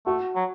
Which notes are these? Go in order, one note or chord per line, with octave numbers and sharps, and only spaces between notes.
A3 F#4
F#3